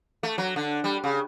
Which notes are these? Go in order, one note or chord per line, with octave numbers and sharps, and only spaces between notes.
A3
F#3
D3
G3
C#3